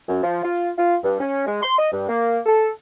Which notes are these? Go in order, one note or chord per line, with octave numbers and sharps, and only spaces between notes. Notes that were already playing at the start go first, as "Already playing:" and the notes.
F#2
F3
F4
F4
G2
C#4
G#3
C6
D#5
G2
A#3
A4